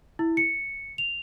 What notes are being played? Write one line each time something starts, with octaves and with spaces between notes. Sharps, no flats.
E4
C#7
F7